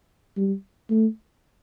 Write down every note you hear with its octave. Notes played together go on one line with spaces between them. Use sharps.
G3
A3